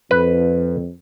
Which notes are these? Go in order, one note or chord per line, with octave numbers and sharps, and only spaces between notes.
F2 B4